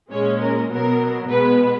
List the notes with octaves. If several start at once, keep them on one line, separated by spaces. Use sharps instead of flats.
A#2 G#3 C#4 C#5
A#4
B2 F#3 B3 A#4
B2 G#3 B3 B4